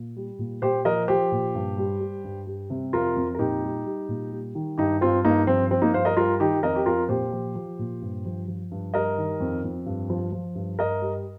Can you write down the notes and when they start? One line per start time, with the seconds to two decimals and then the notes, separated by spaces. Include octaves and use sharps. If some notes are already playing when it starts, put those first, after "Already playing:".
Already playing: A#2
0.16 G3
0.39 A#2
0.62 A#2 G4 C5
0.85 F3 A#4 D#5
1.08 F3 G4 C5
1.32 A#2
1.55 G2
1.78 G3
2.00 G3
2.24 G2
2.47 G3
2.70 C3
2.93 F2 F4 A#4
3.16 F2
3.35 A#4
3.39 A#2 D#4 G4
3.63 G3
3.85 G3
4.09 A#2
4.31 G3
4.55 D#3
4.78 G2 D#4 G4
5.01 G2 C4 F4
5.24 G2 A#3 D#4
5.47 F3 C4
5.71 F3 C4
5.82 A#3 D#4
5.93 G2 C5 F5
6.05 A#4 D#5
6.16 G3 F4 A#4
6.40 D#3 D#4 G4
6.63 F2 A#4 D#5
6.76 G4
6.86 F2 F4 A#4
7.09 A#2 G4 C5
7.33 F3
7.55 F3
7.79 A#2
8.02 G2
8.25 F3
8.48 F3
8.71 G2
8.94 G3 A#4 D#5
9.18 D#3
9.40 F2
9.64 F2
9.86 G2
10.10 F3
10.32 F3
10.55 G2
10.79 G2 A#4 D#5
11.02 G3